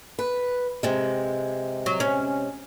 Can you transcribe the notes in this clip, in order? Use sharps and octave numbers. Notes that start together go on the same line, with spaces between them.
B4
C3 G#3
F#3
C#4